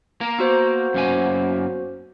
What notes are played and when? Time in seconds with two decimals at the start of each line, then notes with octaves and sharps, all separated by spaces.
0.21 A#3 A#4
0.39 B3 F#4 C5
0.94 F#2 A#3 G#5